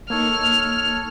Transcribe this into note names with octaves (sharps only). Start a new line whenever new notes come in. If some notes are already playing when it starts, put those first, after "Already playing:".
A#3 D#4 A4 C#5 F6